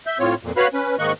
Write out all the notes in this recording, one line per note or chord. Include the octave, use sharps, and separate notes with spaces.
E5 G6
A2 C4 F4 C#5
F2 A#2
F#4 B4 C#5 F5 B5
C#4 B4
G#2 D#3 A#3 D#5 C#6 F#6